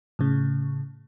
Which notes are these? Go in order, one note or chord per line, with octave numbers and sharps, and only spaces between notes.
A2 C#3